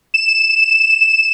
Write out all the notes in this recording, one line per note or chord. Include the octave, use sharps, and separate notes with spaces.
E7